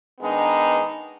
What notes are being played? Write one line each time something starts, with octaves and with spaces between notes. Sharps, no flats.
D#3 G#3 B3 D4 D#4